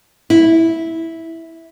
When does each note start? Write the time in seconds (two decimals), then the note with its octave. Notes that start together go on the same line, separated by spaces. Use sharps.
0.30 E4